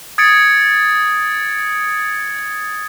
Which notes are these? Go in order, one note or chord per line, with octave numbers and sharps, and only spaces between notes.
D#6 G#6 A6 C#7 D7